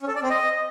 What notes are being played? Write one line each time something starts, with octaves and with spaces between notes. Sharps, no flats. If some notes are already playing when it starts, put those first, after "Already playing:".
C#4
A4
D5
C4
D#5